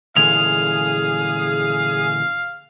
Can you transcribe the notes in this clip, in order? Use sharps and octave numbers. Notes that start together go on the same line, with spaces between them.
A#2 D3 E3 G#4 F5 F7